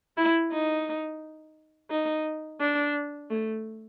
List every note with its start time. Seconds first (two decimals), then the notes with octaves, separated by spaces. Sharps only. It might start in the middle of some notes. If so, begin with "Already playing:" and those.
0.17 E4
0.52 D#4
1.91 D#4
2.60 D4
3.30 A3